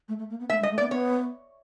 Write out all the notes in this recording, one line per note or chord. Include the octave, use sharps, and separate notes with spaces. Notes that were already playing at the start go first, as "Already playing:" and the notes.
A3
A3
A#3
B3
A3 E5
G#3
D#5
A3
D5
B3
B3 C#5